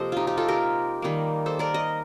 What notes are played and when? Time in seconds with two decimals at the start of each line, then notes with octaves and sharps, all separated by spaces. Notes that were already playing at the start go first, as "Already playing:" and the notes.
Already playing: C3 F3 A#3 A4 C5 D#5
0.12 D#4 F4 G4
0.27 D#4 G4
0.37 F4 A4
0.48 G4 A#4
1.02 D#3 G3 A#3
1.46 A4 C5
1.59 A#4 D5
1.74 D#5